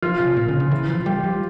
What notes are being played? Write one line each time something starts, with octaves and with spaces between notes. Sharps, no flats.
F3 F4
C3
A#2
C#3
C#3
E3
F3
G3 G4
F3